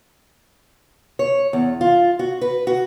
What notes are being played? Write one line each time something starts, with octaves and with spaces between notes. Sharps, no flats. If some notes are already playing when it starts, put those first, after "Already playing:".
C#5
E2
F4
F#4
B4
F#4